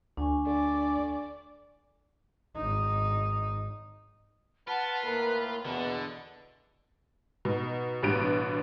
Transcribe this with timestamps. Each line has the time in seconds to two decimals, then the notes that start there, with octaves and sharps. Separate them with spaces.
0.17 D2 D4 G#5 C#6
0.46 D3 D5
2.56 G#1 D#4
4.68 F4 B4 F#5 A5
5.03 A2 A#3 A#4 B5
5.65 E2 B2 D3
7.45 B2 D#4
8.03 A1 G2 B2 B4 D7